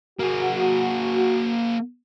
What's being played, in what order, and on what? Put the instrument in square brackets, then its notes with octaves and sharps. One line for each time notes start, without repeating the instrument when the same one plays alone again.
[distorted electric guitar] A#3 G#4 [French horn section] F#4